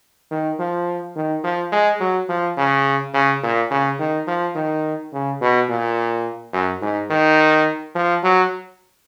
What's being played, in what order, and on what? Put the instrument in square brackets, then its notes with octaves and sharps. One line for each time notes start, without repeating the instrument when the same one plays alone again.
[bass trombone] D#3
F3
D#3
F3
G#3
F#3
F3
C#3
C#3
A#2
C#3
D#3
F3
D#3
C#3
B2
A#2
F#2
G#2
D#3
F3
F#3